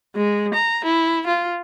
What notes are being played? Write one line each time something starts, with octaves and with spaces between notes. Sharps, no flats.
G#3
A#5
E4
F4